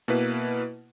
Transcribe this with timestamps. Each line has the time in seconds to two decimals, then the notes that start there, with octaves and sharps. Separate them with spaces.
0.08 B2 A#3 E4 B4